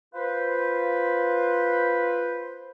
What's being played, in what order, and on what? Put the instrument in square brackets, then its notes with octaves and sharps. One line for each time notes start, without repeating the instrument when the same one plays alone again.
[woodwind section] F4 B4 C5